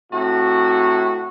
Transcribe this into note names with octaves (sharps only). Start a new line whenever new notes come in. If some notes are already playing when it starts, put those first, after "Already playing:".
A2 C3 F#4